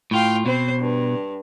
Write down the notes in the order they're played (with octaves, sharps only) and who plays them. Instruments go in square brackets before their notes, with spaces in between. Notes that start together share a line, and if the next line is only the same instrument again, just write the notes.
[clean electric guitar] A2 F4 [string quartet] F5 G5
[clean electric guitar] B2 [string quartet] C4 C5
[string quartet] G2